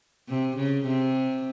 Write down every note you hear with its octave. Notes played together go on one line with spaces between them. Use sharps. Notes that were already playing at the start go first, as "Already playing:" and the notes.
C3
C#3
C3